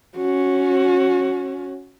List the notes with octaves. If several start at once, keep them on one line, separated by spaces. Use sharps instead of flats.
C#4 F#4